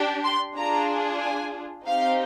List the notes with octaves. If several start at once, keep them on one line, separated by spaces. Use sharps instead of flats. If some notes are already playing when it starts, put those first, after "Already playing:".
Already playing: D4 G4
C6
D4 F4 G#4 A#5
G#5
C4 D#4 G4 F5